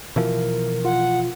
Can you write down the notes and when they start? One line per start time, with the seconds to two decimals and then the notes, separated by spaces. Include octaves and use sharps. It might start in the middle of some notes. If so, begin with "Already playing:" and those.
0.16 B2 E3 F3 A#4
0.85 F4 F#5